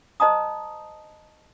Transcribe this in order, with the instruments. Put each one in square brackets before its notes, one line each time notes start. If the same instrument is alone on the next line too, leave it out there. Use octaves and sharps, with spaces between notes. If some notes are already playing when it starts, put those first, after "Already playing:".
[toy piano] C5 D#5 A5 A#5 D#6